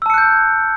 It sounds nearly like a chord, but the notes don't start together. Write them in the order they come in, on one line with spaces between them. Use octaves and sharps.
E6 A5 C#7 F#6 G6